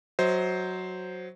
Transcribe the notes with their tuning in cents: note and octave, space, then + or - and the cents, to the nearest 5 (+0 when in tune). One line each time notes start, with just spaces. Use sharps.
F#3 +0 C5 +0 D#5 +35